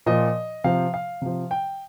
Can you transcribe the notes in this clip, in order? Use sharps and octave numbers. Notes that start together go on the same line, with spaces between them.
A#2 F3 D#5
C3 F3 F5
F5
C3 F3
G5